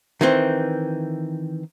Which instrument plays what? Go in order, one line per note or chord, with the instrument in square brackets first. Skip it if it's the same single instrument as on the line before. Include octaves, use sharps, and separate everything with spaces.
[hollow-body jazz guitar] D#3 E3 C4